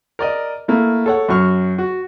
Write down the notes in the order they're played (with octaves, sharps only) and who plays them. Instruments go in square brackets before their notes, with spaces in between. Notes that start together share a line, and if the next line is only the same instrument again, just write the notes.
[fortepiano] A#4 D5 D#5
A3 A#3 E4
A4 C#5 F#5
F#2 F#4 C#6 F6
F#4